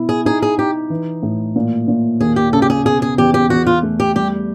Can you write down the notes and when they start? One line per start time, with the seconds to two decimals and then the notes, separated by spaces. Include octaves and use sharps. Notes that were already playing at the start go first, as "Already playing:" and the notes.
Already playing: B2 E4
0.09 G#4
0.25 D#4 G#4
0.42 G#4
0.58 D#4 G4
0.90 E3
1.23 A2
1.56 A#2
1.88 A#2
2.20 D#2 G#4
2.36 G4
2.53 C#3 A4
2.62 G4
2.70 G#4
2.85 B2 G#4
3.02 G#4
3.18 E2 G4
3.34 G4
3.50 E2 F#4
3.67 F4
3.83 A3
4.00 G4
4.16 G3 G4